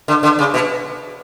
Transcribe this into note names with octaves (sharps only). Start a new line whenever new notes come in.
D3
D3
C#3
B2